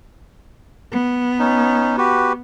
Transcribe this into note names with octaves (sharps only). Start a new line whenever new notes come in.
B3
C#4 D#4
F#4 G4 B4